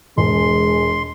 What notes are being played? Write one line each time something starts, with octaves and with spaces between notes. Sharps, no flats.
E1 G#3 C6